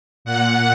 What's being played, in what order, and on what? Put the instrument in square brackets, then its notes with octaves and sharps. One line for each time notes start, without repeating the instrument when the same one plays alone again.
[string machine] A#2 F#5